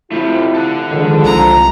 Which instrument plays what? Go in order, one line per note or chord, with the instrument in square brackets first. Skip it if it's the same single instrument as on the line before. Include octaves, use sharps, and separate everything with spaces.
[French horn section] C3 E4 F4 [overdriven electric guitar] A3 G4
[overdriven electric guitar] A4 F#5
[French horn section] D3 F3 G#3 [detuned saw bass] D#3
[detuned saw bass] C2 [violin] A#5